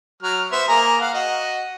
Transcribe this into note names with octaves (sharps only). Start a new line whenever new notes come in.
F#3 F6
B3 C5 E5
A#3 G#4 A#5
F5 F#5
F#4 D#5